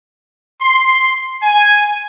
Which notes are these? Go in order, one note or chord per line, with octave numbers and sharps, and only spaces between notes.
C6
G#5